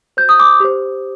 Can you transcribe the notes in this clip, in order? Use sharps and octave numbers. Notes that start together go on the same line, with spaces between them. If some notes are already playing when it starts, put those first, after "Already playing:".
F#4 C5 G6
D#6
D6
G4 C5